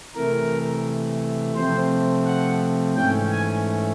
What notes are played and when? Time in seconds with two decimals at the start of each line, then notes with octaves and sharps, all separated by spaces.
0.15 C3 E3 A3 A#4
1.55 C3 F3 A3 C4 C5
2.26 F#5
2.96 G#2 E3 A3 C#4 G5
3.31 G#5